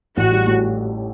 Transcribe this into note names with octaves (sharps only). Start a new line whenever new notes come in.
A1 F#4
G3
A2